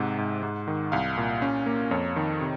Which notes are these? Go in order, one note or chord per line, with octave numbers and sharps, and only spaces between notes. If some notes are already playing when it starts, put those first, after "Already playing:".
Already playing: G#2 C3 F#5
G#2
G#2
D#3
C2 F5
A#2
C#4
A#3
F2 C#5
D#3
C3